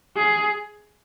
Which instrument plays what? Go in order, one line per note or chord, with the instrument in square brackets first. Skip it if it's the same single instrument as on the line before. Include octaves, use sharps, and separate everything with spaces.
[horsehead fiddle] G#4